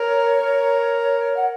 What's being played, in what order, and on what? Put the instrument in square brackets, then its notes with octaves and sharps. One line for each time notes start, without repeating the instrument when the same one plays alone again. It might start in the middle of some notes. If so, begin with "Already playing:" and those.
Already playing: [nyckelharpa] A#4 [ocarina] C#5
[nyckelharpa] A#4
[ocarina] F#5